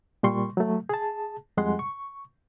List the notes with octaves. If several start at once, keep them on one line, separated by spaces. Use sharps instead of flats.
A#2 G3 C6 C#6
F#3 A3
G#4 A5
F2 G3 G#3 F#5 C6
C#6